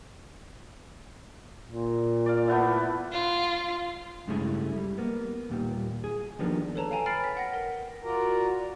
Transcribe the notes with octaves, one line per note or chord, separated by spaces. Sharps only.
A#2
D5 F5
A3 B3 E4
F4
G2 C#3 G#3 A3 C#4 E4
G3
A#3 B3
D#2 A#2 G3
G#4
D#3 F3 G3 A#3 B3 D4
A4 B4 C#5 A5 A#5
F5 G5 G#5 A#5
B5 F6 A6 C7 D7
G5 B6
F#5 G5 A#6
A#4
F4 F#4 A#4 D5 A#5